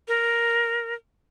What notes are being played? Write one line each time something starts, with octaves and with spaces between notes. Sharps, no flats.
A#4